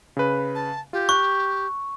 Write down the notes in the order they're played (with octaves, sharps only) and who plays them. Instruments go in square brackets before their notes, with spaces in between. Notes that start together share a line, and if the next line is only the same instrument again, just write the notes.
[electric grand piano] C#3 B4
[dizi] A5
[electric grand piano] F4 [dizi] G4
[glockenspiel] C#6 [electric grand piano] F#6